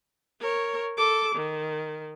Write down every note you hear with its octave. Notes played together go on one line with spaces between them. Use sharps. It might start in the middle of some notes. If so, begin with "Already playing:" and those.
A#4 C#5
A4 D6
D#3